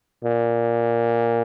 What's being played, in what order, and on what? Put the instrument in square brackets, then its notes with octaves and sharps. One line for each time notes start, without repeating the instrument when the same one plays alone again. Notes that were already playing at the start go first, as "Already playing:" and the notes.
[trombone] A#2